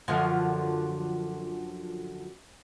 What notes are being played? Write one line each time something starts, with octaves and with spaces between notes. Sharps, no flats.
F#2 D3 F3